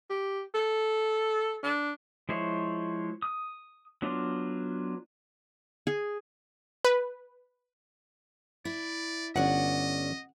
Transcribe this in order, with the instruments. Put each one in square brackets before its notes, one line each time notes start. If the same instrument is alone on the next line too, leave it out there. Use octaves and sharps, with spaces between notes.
[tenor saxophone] G4
A4
D4
[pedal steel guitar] F3 G#3 E4 C5 C#5
D#6
F#3 B3 D4 F4
[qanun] G#4
[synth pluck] B4
[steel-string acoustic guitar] E4 [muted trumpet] D5
[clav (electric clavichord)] G1 [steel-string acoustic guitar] C#4 D5 [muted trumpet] D#5 [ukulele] F#5